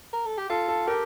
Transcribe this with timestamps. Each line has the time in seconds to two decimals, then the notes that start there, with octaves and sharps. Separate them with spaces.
0.13 A#4
0.26 A4
0.38 G4
0.49 F4 A4
0.68 A4
0.88 G4 A#4